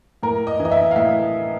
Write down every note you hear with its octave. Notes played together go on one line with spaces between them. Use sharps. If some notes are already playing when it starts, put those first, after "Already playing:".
A2 A#4
D#5
E3
D#5
E5
F5
A2 E5